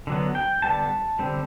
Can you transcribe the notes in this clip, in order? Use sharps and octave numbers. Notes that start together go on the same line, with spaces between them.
D3 F#3 B3
G5
D3 G3 B3 A5
D3 G3 C4